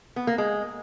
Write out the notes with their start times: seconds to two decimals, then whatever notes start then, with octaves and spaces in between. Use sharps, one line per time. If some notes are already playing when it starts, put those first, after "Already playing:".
0.16 B3
0.27 A#3
0.38 G#3